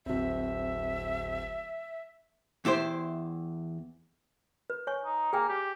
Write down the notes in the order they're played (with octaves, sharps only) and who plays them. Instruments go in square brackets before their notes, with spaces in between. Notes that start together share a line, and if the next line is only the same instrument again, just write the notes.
[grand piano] D1 C4 [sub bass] G1 [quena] E5
[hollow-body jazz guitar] E2 E4 G4 C5
[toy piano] B4
C#5 G#5 C#6
[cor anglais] D#4
[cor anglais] A#3 [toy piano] G#4 G5 G#5
[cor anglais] G4